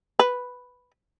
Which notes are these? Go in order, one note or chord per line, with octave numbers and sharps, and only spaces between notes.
B4